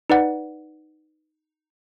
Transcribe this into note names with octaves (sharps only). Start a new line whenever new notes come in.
D#4 B4 D5 F#5